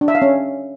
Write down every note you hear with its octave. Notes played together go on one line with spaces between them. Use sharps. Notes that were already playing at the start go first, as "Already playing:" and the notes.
D4
E5
F5
C#4